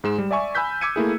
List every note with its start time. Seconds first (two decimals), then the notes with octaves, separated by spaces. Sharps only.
0.04 G#2 G#3 E7
0.18 G3
0.31 D5 E5 G#5 C#6
0.55 G#5 B5 E6 F#6 G6 B6
0.81 D6 E6 G#6 C#7 D#7
0.96 A3 A#3 E4 G#4